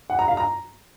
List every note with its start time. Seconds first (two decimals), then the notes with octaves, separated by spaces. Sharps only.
0.10 F#5
0.19 A#5
0.28 F5
0.37 A#5